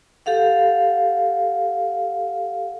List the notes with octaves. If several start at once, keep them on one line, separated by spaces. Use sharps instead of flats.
G4 A4 F5 F#5